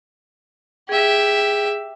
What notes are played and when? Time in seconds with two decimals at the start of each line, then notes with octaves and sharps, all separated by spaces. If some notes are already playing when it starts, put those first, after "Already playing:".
0.89 G4 G#4 E5